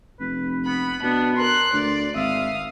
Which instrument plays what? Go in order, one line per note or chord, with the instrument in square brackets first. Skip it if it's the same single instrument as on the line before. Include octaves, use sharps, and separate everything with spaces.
[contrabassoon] F1 [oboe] B4
[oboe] B3 [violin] B5
[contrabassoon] B2 [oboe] B3 [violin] D4
[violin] A#4 F#6 [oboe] C6
[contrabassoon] D2 [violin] D5
[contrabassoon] G#1 [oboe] E5 [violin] F5 D#6